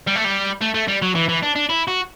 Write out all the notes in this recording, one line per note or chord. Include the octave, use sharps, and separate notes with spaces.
G3
A3
G3
A3
A3
G3
F#3
E3
E3
D4
D4
E4
F#4